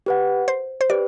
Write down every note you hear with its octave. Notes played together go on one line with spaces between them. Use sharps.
G4 B4 F#5
C5
C5
G4 B4 D5